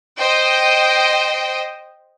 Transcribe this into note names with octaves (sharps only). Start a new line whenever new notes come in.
C5 D#5 G5